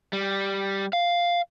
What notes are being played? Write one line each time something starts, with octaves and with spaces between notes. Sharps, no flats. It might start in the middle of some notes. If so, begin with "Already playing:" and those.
G3
F5